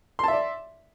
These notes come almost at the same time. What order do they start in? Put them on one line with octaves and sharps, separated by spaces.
C6 A5 E5 D5